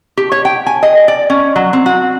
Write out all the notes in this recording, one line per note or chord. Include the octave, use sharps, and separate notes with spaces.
G4
C#5
G5
G#5
D#5
D5
C#4
F#3
C4
F#4